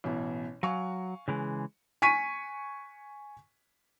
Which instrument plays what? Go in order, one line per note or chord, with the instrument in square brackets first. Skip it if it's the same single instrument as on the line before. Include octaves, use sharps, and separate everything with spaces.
[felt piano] A1 B2 E3
[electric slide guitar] F#3 [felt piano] F5 G#5 C#6
[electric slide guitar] C#3 E3 G#3
[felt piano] G#5 C#6 B6 D#7